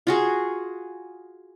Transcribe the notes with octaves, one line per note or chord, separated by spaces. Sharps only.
F4 F#4 G#4